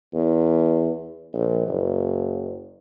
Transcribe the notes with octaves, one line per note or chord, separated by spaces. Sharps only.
E2
A#1
F#1